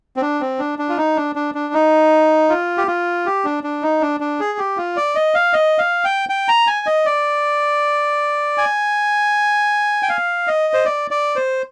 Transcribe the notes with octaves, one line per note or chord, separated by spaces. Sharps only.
C4
D4
C4
D4
D4
F4
D#4
D4
D4
D4
D#4
F4
G4
F4
G4
D4
D4
D#4
D4
D4
G#4
G4
F4
D5
D#5
F5
D#5
F5
G5
G5
A#5
G#5
D#5
D5
G#5
G5
F5
D#5
C5
D5
D5
C5